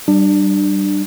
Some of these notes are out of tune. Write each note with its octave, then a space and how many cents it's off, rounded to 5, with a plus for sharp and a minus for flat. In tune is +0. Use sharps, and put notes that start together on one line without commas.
G3 -20 D4 +25